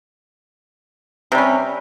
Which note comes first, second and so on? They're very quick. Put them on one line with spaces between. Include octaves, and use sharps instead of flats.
C3 G3 C#4